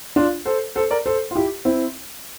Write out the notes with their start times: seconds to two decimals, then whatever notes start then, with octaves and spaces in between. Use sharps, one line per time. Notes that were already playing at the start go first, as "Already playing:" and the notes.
0.16 D4 F4
0.46 A4 C5
0.75 A4 C5
0.91 A#4 D5
1.06 A4 C5
1.31 F4
1.36 E4 G4
1.65 C4 E4